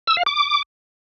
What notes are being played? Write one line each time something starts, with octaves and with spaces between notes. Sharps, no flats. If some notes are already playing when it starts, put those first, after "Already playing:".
E6
F5
D6